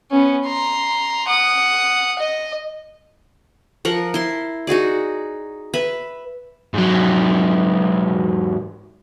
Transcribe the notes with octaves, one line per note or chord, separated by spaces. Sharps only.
B3 C#4
A#5 C6
F#5 D#6
D#5
F3 A#4 F#5
E4 C6
D#4 F#4 G#4 D5
B4 E5 B5
G#2 F#3